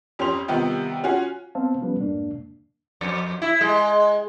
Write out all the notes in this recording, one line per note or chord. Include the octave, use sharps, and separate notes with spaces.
F2 C#4 G4 C6 F7
C3 D#3 G3 B3 F4 G4
C#4 F4 F#4 F#5 G#5
B3 C4 C5 F5 A5
F3 G3 B3 C#4 B4
F2 G#2 A#3 D4
F2
E4
G#3